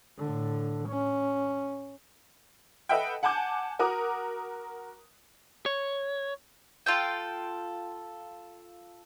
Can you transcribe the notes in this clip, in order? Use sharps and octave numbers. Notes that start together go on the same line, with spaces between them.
A2 D3
C#4
A4 B4 D#5 E5 F#5 G5
F#5 G#5 A5 D6 G6
F#4 A#4 A#5 D6 D#6 F#6
C#5
F4 A4 G5